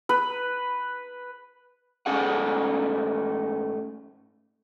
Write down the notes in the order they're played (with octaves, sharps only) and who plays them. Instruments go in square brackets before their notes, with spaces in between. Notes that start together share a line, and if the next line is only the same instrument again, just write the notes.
[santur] B4
[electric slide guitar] G#2 A3 C#4 G#4 F#5